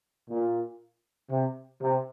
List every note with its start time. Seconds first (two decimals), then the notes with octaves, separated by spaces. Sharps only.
0.30 A#2
1.31 C3
1.82 C3